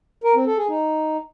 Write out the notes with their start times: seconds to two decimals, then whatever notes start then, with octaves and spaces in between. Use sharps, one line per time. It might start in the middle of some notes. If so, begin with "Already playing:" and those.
0.24 A#4
0.35 C4
0.46 A4
0.58 G#4
0.69 D#4